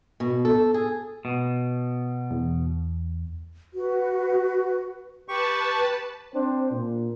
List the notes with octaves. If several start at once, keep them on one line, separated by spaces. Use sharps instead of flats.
B2
A4
G#4
B2
E2
F#4 B4
G4 B4 A5 C#6
C4 D4 C5
A#2